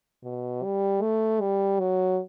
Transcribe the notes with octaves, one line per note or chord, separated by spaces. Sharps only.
B2
G3
A3
G3
F#3